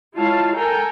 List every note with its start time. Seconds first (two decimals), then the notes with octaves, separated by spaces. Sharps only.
0.16 G#3 E4 F4 C#5 F5 A5
0.57 A4 A#4 G5 G#5 A#5